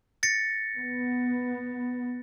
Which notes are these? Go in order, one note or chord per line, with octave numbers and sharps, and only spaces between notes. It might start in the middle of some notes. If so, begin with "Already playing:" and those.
A6 A#6 C#7
B3